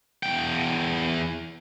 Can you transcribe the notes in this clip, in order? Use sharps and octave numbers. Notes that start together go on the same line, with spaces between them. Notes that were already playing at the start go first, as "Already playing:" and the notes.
E2 G5